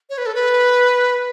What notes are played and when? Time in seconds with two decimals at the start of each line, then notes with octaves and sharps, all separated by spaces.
0.10 C#5
0.18 B4
0.26 A4
0.35 B4